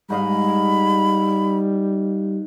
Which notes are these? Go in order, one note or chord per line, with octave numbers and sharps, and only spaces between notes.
G#2 G3 D#5 F5 B5